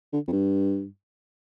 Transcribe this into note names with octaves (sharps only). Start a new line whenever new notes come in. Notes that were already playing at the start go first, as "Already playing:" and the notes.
D3
F2
G2